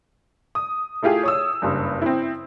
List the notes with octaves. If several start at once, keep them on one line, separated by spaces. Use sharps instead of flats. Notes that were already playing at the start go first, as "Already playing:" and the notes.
D#6
A3 E4 F4 G4 G#4
C#5 D#6 E6
F#1 G2
C4 E4